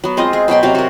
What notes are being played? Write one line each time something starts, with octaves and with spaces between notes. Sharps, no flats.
F#3 B3
G#3 C4 F4 D#5
G#4
B2 F#3 G5 C6
C3 F#3 F5
F#4 A#4